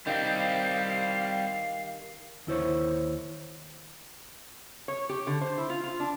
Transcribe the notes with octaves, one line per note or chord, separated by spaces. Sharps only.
D#3 G3 C4 G4 F5
D#2 E4 C5 C#5
C#5
G4
D3
C5
E4
F4
F4
D4